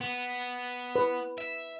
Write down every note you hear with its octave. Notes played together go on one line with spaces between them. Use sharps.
B3
B4
E5